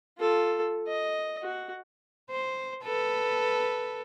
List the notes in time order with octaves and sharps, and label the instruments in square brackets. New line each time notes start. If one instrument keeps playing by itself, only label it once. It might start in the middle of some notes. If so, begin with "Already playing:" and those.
[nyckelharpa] F4 A4
D#5
F#4
[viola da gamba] C5
A4 B4